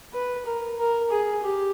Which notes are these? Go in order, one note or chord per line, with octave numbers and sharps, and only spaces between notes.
B4
A#4
A#4
G#4
G4